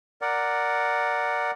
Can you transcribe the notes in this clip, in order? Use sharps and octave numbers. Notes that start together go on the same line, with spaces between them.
A#4 D5 F#5